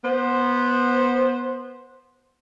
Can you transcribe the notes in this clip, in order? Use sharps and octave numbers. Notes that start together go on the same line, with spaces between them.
B3 C5